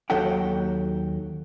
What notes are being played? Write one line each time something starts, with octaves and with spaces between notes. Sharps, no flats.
D#2 D#3 F#3 A4 F#5 G5